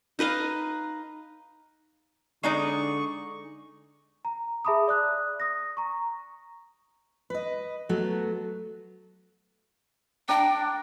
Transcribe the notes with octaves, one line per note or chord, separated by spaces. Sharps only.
D#4 B4 D#5 F5
D3 G#3 D#4 D5 C#6
A#5
G#4 E5 A5 B5 D6 D#6
D5 D#6 F#6
D#6 A#6
A#5 C#6
B4 D#5
F#3 A3 B3 F#4
D4 G5 A#5